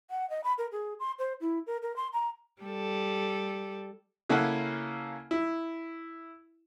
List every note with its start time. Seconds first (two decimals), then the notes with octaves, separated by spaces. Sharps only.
0.11 F#5
0.30 D#5
0.44 B5
0.58 A#4
0.72 G#4
1.00 C6
1.19 C5
1.41 E4
1.67 A#4
1.82 A#4
1.96 C6
2.13 A#5
2.62 G3 A4
4.29 C#3 A#3 C#4 E4 A4 F#5
5.31 E4